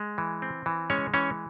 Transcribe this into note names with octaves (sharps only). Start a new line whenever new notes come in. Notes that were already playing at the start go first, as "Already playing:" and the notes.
Already playing: G#3
E3
C4
E3
G#3 C#4 C#5
E3 C#4 C#5